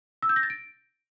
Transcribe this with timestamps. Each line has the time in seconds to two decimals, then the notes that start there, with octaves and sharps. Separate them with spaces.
0.23 E6
0.29 G6
0.36 A#6
0.43 A6
0.50 D7